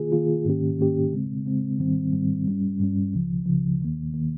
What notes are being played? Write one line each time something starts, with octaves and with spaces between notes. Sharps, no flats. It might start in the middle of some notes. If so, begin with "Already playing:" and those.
Already playing: D#3 A#3 F4 G#4
D#3 A#3 F4 G#4
G#2 D#3 A#3 C#4 G4
G#2 D#3 A#3 C#4 G4
C#3 G#3 C4
C#3 G#3 C4
G#2 D#3 G3 C4
G#2 D#3 G3 C4
G2 G3 C#4
G2 G3 C#4
C#2 C#3 F3
C#2 C#3 F3
D#2 D#3 A#3
D#3 A#3